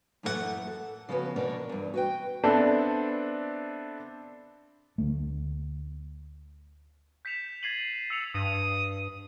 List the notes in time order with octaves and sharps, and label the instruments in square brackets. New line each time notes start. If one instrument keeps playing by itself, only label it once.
[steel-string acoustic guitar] F#2 A2 E3 A3 G4 F#5
A4
C#3 F3 B3 C#4 F#4 B4
B2 D4 A#4 C#5 D5
E2 G2
F#4 B4 G5
[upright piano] B3 C4 D4 A4 D5 E5
[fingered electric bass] D2 A3
[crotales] G6 B6 C#7 E7 F7
G#6 A6 C7 D#7 F#7
E6 C7 C#7 E7 F7
[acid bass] G2 [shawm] D#6